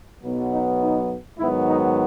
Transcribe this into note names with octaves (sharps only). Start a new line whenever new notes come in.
B1 B2 F#3 B3
D#4
D#4
G#2 D#3 F#3 B3 E4
D#4